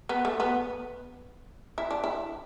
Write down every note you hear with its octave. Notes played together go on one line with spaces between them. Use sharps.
B3
A3
B3
E4
D4
E4